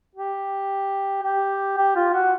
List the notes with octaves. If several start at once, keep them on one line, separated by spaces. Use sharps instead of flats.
G4
G4
G4
F4
F#4